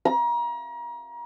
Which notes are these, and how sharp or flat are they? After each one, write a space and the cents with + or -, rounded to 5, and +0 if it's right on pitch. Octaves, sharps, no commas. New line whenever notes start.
A#5 +35